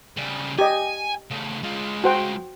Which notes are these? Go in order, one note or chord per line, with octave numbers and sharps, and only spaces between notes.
C#3 G3
G4 D#5 G#5
C#3 A3
G#3 F4
F#4 C5 G5